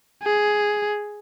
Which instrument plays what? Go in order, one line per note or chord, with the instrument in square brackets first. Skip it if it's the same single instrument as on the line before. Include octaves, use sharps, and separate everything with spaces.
[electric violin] G#4